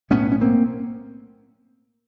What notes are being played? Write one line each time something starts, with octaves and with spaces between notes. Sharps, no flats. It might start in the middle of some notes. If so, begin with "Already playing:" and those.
B1 A2 B3 C#4
C#4
A#3 C4